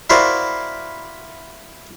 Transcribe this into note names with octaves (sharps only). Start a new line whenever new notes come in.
E4 F#4 A#4 C5 D5 F5